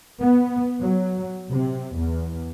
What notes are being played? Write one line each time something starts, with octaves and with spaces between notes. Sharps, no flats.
B3
F#3
C3
E2